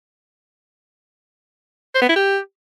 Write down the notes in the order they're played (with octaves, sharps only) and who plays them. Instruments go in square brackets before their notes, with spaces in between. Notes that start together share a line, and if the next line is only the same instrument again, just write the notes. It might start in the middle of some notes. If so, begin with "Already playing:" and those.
[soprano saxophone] C5
B3
E4
G4